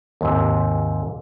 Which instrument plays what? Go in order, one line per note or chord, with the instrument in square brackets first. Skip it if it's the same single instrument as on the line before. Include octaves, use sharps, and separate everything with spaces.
[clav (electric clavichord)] D#2 G#2 C3